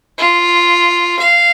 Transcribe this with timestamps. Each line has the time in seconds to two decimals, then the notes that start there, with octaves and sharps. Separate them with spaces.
0.18 F4
1.19 F5